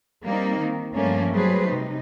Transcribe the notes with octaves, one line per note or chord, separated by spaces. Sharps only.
G3 A#3 C4 D#4
D#3
G2 F3 A3 A#3 C#4
F#3 G3 A3 G#4 B4 C5
C3 D#4